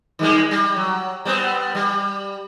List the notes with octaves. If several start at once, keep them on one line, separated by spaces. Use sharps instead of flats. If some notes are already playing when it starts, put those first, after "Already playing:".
D#3 G3 G#3
G3
F#3
G3 B3 C4
G3